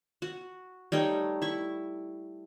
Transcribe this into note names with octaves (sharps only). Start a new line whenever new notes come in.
F#4
G3 A3 D#4 C#5
E4 C#6